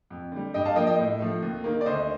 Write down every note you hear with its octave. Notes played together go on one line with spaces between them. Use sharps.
F2
D3 G3
G2 D#5 G5
F5 A5
F3 A#3 D#5 G5
D#5 G5
A2
F3 A3
D#2
D#3 A#3
D5
D2 C5 D#5